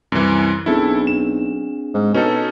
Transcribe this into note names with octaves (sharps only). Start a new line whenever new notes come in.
C2 F#2 E3
B1 C4 D4 E4 G#4 A4
E7
G#2
B2 C#4 D#4 A4